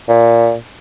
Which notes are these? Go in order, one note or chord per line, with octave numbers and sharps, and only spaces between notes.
A#2